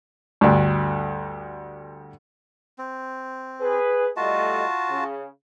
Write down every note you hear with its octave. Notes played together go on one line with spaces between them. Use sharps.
D2 G2
C4
G#4 B4
G3 A3 F4 F#4 D#5 A5
C#3